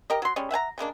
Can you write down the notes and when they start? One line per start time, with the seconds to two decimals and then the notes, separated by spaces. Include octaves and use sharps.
0.10 G4 A#4 D#5
0.22 F#3 C6
0.36 G3 G#3 C#4
0.51 E5 F#5 G#5 A#5
0.78 C#3 G#3 A#3 D4